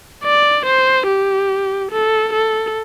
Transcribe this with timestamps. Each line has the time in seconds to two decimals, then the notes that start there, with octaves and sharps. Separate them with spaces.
0.24 D5
0.66 C5
1.07 G4
1.91 A4
2.33 A4